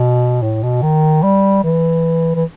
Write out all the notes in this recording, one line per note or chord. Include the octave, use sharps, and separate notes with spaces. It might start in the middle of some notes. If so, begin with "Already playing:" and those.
Already playing: B2
A2
B2
D#3
G3
E3
E3